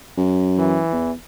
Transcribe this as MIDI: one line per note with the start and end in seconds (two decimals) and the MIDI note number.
0.17 0.81 42
0.58 1.12 52
0.93 1.13 40